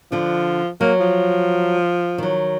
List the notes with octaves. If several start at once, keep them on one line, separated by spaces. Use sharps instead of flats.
D3 F3 D4
F#3 A#3
F3
D#3 F#3